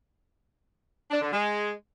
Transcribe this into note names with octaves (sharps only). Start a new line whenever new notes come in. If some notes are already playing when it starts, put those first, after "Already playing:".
D4
D3
G#3